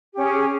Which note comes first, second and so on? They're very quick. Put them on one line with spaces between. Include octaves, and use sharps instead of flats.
G4 C#4 G#4